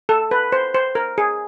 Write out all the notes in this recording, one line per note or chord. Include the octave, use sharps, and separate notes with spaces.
A4
B4
C5
C5
A#4
G#4